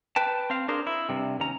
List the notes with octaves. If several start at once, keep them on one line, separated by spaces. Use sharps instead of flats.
B4 G5 A5
C4 F5
D4 G#4 A#4 C5
E4
G2 C3
D#2 C#4 A#5